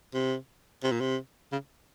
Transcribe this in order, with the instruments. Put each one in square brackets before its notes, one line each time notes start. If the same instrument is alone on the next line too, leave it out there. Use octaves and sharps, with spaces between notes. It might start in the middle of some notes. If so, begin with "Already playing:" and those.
[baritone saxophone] C3
C3
A#2
C3
C#3